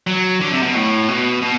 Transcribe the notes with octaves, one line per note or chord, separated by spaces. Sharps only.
F#3
D3
C3
B2
A2
B2
B2